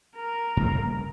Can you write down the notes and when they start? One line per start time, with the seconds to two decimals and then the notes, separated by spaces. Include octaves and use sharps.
0.15 A#4
0.57 G2 C#3 A#3